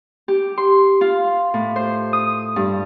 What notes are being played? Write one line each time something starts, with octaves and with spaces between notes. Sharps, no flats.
G4
C6
F4
A2
C5
D#6
G2